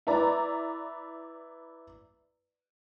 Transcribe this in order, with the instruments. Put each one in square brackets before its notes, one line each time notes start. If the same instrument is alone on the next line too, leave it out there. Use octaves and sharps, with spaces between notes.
[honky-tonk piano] E4 B4 D5 A#5